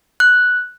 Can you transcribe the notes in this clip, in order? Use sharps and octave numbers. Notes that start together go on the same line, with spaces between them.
F#6